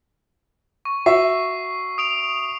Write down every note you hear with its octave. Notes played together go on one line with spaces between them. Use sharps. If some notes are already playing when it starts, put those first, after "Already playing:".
C#6
F#4 E5 C#6 C7
D#6 D7 F7